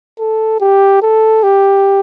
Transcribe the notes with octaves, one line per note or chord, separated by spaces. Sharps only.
A4
G4
A4
G4